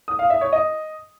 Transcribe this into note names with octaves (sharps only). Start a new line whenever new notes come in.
D#6
F5
E5
C#5
D#5